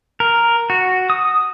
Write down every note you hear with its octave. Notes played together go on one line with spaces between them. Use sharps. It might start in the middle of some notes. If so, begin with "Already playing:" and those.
A#4
F#4
D#6